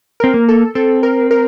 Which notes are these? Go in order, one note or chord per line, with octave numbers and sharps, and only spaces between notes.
C4 A#4
A#3
A4
C4 A4
A#4
A#4